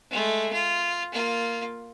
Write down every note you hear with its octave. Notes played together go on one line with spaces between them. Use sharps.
G#3 A3
F4
A#3 F4